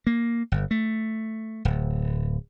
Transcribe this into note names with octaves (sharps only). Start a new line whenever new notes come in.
A#3
G1
A3
D1